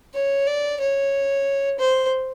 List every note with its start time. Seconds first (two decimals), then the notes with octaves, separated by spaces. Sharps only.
0.14 C#5
0.47 D5
0.80 C#5
1.79 C5